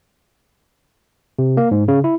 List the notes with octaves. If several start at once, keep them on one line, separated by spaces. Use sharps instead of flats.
C3
A#3
G#2
C#3
E4